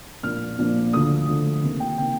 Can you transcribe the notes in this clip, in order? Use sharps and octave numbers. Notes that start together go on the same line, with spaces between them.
A#2 F3 A#3 D4 F6
A#2 F3 A#3 D4
D2 D3 F3 A3 D#6
D2 D3 F3 A3
C3 D#3 A#3
G5
C3 D#3 A#3 G5